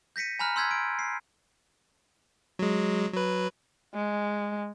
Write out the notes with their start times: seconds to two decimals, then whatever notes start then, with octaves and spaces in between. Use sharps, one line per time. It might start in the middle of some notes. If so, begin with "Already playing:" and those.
0.16 G6 A#6 B6 C#7 D#7
0.39 G#5 A#5 B5 F6 F#6
0.56 C6 E6 G6 G#6 B6
0.71 D7
0.99 C7
2.59 F#3 G#3
3.13 F#3 B4
3.94 G#3